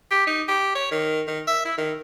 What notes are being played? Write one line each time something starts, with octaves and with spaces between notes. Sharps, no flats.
G4
D#4
G4
C#5
D#3
D#3
E5
E4
D#3